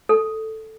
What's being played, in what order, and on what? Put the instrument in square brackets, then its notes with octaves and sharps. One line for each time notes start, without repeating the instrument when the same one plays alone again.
[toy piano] A4